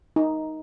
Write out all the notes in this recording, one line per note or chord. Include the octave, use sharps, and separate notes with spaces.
D#4